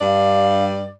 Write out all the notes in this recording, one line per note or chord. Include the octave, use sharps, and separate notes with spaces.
G2 D5 F5